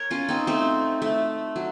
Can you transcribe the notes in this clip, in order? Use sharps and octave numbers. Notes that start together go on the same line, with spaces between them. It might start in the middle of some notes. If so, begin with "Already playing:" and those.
Already playing: A#4 C#5
C#4 F4
C4 D#4
A3 C4
A3
F#3